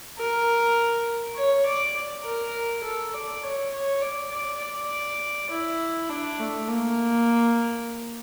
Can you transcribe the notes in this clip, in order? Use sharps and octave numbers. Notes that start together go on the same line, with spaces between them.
A#4
C#5
D5
A#4
A4
D5
C#5
C#5
D5
D5
D5
E4
D4
A3
A#3